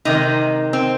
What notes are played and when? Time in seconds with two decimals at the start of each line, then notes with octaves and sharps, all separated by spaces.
0.05 C3 D#3 G#3 D#4
0.73 C4